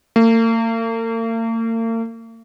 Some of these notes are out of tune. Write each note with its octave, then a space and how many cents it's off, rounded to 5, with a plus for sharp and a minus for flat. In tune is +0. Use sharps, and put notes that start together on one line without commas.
A#3 -45